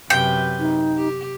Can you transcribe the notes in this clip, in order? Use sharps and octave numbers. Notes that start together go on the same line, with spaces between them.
F#2 C3 B4 G5
D#4
G4